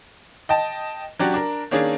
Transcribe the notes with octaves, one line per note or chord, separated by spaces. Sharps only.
D#5 G5 A5
F#3 C#4 D4 F#4 G4
D4 A#4
D#3 A#3 C#4 D4 G#4